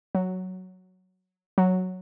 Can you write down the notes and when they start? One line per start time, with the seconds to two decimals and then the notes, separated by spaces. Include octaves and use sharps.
0.15 F#3
1.58 F#3